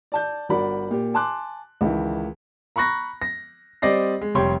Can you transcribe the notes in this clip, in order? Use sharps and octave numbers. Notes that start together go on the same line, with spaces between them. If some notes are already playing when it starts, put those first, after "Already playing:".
D5 A5 G6
G1 F#4 A#4 D5 B5
A#2 G4
G#5 A5 C6 D6 F#6
C#2 D#3 E3
A#5 B5 C#6 F#6 A#6
A#6
G3 C4 D5 D#5 A#6 C7
G#3
F1 G3 C#5 G5 C6